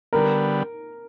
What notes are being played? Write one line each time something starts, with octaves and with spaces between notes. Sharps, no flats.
D3 G3 B3 A#4